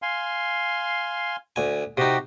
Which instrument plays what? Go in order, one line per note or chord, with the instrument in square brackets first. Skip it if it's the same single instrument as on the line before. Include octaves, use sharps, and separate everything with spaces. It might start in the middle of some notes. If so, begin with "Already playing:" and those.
[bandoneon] F5 G#5 C6
[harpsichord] D2 G#5
[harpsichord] C3 D#4 [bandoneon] F#4 G4